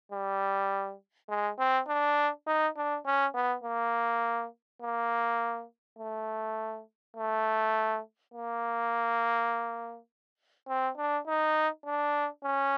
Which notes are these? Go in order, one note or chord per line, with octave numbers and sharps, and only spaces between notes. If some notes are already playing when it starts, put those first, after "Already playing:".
G3
G#3
C4
D4
D#4
D4
C#4
B3
A#3
A#3
A3
A3
A#3
C4
D4
D#4
D4
C#4